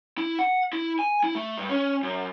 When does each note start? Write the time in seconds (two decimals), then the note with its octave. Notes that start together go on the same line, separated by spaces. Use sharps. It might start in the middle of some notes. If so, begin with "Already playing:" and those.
0.18 E4
0.39 F#5
0.73 E4
0.99 G#5
1.24 E4
1.35 A3
1.57 G2
1.69 C#4
2.03 F#2